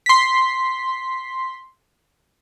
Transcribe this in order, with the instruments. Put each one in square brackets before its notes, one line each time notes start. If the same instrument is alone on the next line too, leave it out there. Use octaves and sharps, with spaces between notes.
[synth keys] C6 B6